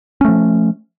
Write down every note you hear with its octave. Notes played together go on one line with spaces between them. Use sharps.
F3 A3 C#4